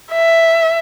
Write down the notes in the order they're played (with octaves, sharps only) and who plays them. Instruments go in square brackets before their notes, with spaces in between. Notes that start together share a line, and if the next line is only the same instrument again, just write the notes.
[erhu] E5